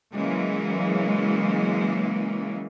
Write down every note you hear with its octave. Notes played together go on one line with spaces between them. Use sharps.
C#3 E3 F#3 G#3 A#3